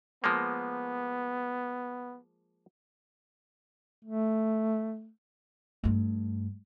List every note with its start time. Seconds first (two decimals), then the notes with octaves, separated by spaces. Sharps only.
0.24 F3 G#3 A#3 B3
4.05 A3
5.84 G2 A3